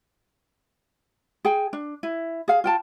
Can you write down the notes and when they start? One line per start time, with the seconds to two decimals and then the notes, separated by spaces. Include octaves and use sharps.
1.45 G#4 G5 G#5
1.73 D4
2.03 E4
2.48 G#4 F5
2.64 F4 G5 A5